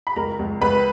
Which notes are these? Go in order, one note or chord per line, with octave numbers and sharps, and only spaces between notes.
B5
C#2 A#4 A#5
C#2
C#2 B4 B5